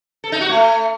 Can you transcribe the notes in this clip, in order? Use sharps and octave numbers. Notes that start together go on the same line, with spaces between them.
A4
D#4
F#4
A3